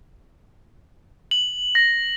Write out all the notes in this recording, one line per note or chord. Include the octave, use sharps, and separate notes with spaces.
F#7
A#6